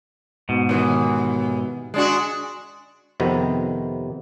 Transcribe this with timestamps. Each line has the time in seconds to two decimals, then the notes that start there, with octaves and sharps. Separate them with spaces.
0.49 G#2 B2
0.69 D#2 E3
1.94 G#3 D4 F#4
3.20 F2 C3 D#3 B3